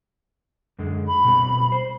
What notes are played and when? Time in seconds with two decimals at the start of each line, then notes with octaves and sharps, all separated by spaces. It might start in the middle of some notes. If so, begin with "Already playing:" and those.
0.79 F#2 D3 G#3
1.07 B5
1.24 B2 G3 C4
1.72 C5